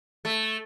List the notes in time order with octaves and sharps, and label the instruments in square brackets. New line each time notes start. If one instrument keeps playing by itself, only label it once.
[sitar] A3